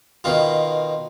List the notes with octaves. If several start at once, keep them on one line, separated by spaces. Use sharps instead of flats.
B2 D#3 F4